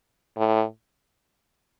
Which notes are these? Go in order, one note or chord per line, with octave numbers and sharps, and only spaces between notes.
A2